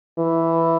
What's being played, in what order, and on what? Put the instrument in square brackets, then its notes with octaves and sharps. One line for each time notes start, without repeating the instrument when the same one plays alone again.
[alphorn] E3